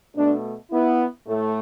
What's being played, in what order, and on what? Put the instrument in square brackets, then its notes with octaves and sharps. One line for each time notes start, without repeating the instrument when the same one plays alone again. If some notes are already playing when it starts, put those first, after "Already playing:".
[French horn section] B2 A3 D4
B3 E4
A2 A3